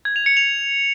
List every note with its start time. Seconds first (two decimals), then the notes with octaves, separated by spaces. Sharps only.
0.05 G#6
0.16 F7
0.26 C#7
0.37 F7